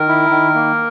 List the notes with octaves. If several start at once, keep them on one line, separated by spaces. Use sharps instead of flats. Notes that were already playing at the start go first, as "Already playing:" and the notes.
Already playing: D#3 A#4
E4
D#3
A#3